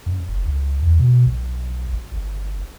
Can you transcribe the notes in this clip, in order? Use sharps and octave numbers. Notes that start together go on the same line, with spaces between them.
F#2
F#1
C#2
E2
B2
B1
G#1
G1